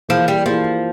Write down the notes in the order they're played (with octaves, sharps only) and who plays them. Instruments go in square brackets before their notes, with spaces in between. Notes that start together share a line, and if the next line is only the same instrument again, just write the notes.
[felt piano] E3 A#3 E4 G#4 [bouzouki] F3
[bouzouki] G3
[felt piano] E3 A#3 E4 G#4 [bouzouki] F3